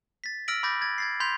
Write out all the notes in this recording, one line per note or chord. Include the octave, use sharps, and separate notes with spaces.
A6 B6
E6 F6 A#6 B6 D7 F#7
B5 D6 G6 A6 A#6
G#6 A6
G#6 A6 C7
B5 C6 G6 G#6 B6 F7